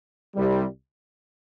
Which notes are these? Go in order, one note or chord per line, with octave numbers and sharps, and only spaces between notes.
C2 C3 G3